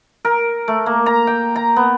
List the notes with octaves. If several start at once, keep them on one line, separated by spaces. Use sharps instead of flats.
A#4
A3
A#3
A#5
G5
A#5
B3